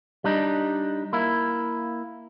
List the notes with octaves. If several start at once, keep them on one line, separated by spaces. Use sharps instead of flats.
G3 D4 D#4
A#3 E4